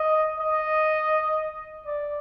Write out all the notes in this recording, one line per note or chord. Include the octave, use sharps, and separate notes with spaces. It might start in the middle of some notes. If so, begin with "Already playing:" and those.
Already playing: D#5
D#5
D5